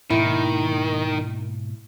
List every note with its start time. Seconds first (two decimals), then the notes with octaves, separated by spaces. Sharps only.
0.10 G#2 B2 D#3 A#3 E4